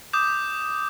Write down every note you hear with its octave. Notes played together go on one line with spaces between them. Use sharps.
D6 D#6 G6